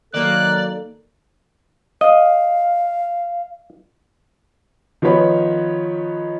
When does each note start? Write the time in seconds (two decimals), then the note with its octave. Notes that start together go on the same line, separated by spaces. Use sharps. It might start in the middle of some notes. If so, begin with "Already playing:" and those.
0.14 D#3 F#3 A#3 A4 D5 F#6
2.01 D#5 F5
5.02 D#3 F3 B3 B4 C#5 B5